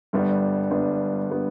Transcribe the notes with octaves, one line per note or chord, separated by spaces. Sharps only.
G1 G2 G3 B3 D4
G1 G2 G3 B3 D4
G3 B3 D4